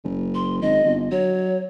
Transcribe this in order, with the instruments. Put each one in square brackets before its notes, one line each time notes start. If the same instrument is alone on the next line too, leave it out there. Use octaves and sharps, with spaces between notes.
[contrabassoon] F#1
[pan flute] C6
[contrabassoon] G#1 [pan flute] D#5
[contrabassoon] G1
[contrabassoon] F#3 [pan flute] C#5